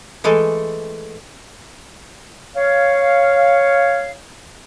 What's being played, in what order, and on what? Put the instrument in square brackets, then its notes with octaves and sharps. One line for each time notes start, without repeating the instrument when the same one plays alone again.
[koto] E3 G#3 A3 A4
[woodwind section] C#5 F5